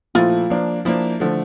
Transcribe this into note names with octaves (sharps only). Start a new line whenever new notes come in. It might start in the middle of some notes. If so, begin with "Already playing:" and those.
A#2 F3 A3 E4 F4
F3 A#3 D4
F3 A#3 D4 E4
D3 F3 A3